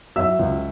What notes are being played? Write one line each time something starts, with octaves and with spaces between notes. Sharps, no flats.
F#3 E5 E6
C#2